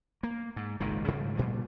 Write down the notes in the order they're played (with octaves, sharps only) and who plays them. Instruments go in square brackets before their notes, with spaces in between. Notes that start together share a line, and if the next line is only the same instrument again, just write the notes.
[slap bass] A#3
G#2
G#1 C#2 A#2 D#3
G#2 C#3 F3 G3
A#2 F3 G3 A3